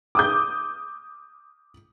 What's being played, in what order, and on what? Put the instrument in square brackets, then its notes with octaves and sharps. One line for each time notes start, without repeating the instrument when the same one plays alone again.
[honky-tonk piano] D6 D#6 G6